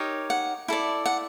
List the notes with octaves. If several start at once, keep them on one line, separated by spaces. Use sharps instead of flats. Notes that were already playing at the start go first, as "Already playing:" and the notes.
Already playing: D#4 G4 A#4 C#5
F#5
E4 A4 D5
F#5